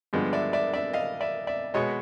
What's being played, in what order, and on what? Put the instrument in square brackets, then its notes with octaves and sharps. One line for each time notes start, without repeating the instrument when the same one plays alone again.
[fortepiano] G2 D3 F3 G#3 B3
D5 E5
D5 E5
D5 E5
D#5 F5
D5 E5
D5 E5
B2 G#3 B3 C#5 D#5